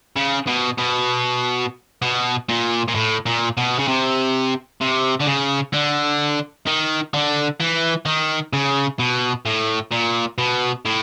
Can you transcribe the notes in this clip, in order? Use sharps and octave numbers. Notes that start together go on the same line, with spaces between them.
C#3
B2
B2
B2
A#2
A#2
A2
A#2
B2
C#3
C3
C3
D3
C#3
D3
D#3
D3
E3
D#3
C#3
B2
A2
A#2
B2
A2